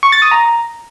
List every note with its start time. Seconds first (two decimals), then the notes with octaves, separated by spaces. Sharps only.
0.03 C#6
0.12 A6
0.22 D#6
0.31 A#5